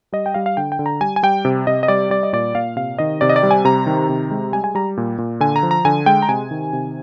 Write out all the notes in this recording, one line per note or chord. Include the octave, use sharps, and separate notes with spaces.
G3 D#5
G5
G3 F5
F5
D3 G5
G5
D3
A#5
G3 G#5
G#5
G3 G5
C3
C3 D#5
D#5
G3 D5
G3 D5
D#5
A#2 D5
A#2 F5
C3 F5
D#3 D#5
C3 D5
D#5
D5
G3
G#5
C3 A#5
D#3
C3
G#3
G3 G#5
G#5
G3 A#5
A#2
A#2
D3 G#5
A#5
F3
A#5
D3 G#5
G#3 G5
A#5
C3 G#5
D#3
C3